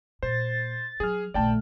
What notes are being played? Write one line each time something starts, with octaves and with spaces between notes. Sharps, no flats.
A#2 C5 A6
F#3 G#4 F6
A#1 D3 A3 D5 G5 A5